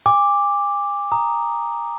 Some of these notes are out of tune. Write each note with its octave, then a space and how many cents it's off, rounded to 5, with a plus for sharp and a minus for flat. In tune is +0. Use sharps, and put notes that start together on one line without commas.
G#5 -40 D6 +0
A#5 +0 D#6 +0